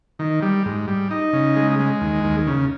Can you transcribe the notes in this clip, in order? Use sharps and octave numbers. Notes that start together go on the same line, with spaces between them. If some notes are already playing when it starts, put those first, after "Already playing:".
D#3
G3
G#2
G3
D#4
C#3
G#3
G#3
D#2
D#2
C#3